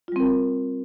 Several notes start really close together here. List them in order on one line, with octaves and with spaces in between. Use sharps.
F4 G3 C4 A#4